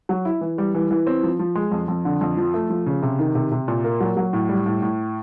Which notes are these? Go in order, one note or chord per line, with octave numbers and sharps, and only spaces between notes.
F#3
E4
E3
G3
E3
E3
C4
F3
F3
G#3
F2
F2
D3
F2
F3
A3
F3
C#3
C3
D#3
C3
C3
A#2
A#3
F#3
F#3
A2
G3
A2
A2